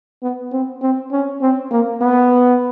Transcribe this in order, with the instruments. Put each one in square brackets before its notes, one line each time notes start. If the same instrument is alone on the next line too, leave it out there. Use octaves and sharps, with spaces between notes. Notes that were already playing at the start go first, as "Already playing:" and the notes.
[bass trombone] B3
C4
C4
C#4
C4
A#3
B3